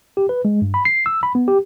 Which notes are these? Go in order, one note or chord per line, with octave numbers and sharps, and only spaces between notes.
G4
B4
G#3
G2
B5
C7
E6
B5
B3
G4